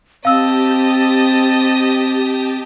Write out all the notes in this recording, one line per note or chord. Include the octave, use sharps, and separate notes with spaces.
C4 G4 D#5 F5 A5 E6